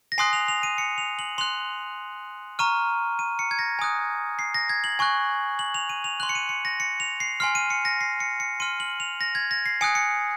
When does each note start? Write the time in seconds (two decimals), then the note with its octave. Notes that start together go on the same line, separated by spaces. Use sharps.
0.12 A#6
0.18 G#5 C6 D#6 F#6 C7
0.33 F7
0.48 F7
0.63 D#7
0.78 C#7
0.98 F7
1.19 F#7
1.38 C6 F#6 F7
2.59 A#5 C#6 F6 D#7
3.19 D#7
3.39 C#7
3.51 G#6
3.59 A#6
3.79 G#5 D#6 F#6
4.39 C7
4.54 A#6
4.69 G#6
4.84 F#7
4.99 G#5 C#6 F#6
5.59 F#7
5.74 F7
5.89 D#7
6.04 F7
6.20 C6 F#6 F#7
6.29 C#7
6.35 D#7
6.49 C#7
6.65 A#6
6.80 C#7
7.00 F7
7.20 C7
7.40 G#5 C6 F6 C7
7.55 D#7
7.70 C#7
7.85 A#6
8.01 C7
8.20 C#7
8.40 C#7
8.60 C6 F6 D#7
8.80 F#7
9.00 F7
9.21 A#6
9.35 G#6
9.51 A#6
9.66 C7
9.81 G#5 D#6 F#6 C#7
9.95 C#7